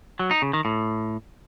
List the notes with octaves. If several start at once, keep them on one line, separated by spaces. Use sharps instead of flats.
F#3
D#4
C#3
D#3
A2